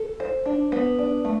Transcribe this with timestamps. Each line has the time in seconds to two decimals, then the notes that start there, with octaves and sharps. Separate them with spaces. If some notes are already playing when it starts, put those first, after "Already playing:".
Already playing: A4
0.20 C5
0.46 D4
0.72 B3
0.98 D4
1.25 A3